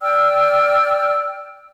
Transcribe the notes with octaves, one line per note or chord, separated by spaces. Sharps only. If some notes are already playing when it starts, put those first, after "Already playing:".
D5 G5 E6 F6